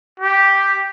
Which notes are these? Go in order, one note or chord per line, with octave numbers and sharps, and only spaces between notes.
G4